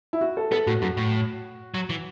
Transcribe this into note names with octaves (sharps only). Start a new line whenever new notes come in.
E4
F#4
A4
B3 A4
A2 F#4
F#2 F#4
A2
F#3
E3